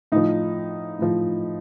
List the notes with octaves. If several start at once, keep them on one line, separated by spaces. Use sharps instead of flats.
A2 F3 D#4
A2 F3